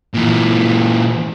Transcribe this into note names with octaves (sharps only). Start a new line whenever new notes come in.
A#2 E3